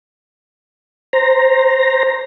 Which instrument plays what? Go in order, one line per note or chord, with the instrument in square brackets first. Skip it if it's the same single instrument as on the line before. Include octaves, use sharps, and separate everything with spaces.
[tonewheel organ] C5 A#5